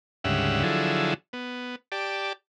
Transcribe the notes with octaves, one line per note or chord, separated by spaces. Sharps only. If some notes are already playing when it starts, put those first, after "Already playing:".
D2 G#2 C#3 G3 E5 F#5
D3 F3 F#3 E4 G#4 A4
B3
G4 D5 A5